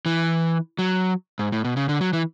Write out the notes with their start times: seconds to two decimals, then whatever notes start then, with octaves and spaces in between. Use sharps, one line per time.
0.06 E3
0.79 F#3
1.39 G#2
1.52 A2
1.65 B2
1.77 C#3
1.89 D3
2.01 F#3
2.13 E3